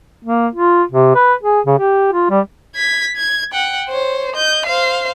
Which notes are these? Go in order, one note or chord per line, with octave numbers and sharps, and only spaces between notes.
A#3
F4
C3
B4
G#4
C#3
G4
F4
G3
G#6 B6
G#6
F#5 G5
C5 C#5
D#5 G6
C5 F5